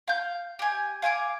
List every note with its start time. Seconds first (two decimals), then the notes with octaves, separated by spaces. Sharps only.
0.08 F5 G6
0.59 G4 G#5
1.02 F5 G#5 C6 D6